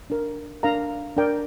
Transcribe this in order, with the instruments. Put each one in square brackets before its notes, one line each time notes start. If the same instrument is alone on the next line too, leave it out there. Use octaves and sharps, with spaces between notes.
[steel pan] D4 A#4
D4 A#4 F5 A#5
D4 A#4 D5 G5